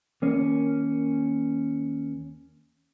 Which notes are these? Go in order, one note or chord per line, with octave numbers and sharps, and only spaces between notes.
D#2 A#3 C#4